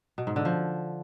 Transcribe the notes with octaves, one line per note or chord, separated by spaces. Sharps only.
B2
G#2
D3
F3